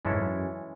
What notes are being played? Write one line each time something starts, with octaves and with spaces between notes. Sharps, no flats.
F#2 E3 G#3 C#4 E4 A4
G#2
F#2